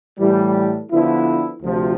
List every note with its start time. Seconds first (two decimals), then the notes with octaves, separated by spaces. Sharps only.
0.18 A2 E3 G3
0.91 D3 F3 B3 E4
1.62 D2 C3 F3